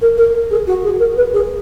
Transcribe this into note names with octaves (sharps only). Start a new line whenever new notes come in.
A#4
A#4
G#4
F#4
G#4
A#4
B4
G#4